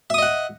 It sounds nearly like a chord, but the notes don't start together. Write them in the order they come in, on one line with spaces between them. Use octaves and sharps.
E5 D#6 D#5 F#5